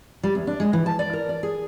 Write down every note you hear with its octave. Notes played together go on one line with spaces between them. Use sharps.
G3
E2
D4
G#3
E3
A5
D5
A#4
D5
G#4